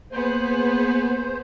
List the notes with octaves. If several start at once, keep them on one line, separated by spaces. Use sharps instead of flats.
A#3 B3 G#4 C5